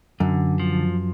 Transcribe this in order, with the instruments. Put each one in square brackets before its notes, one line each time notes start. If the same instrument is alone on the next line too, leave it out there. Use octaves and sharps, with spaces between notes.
[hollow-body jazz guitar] F#2 [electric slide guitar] D3
[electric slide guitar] F3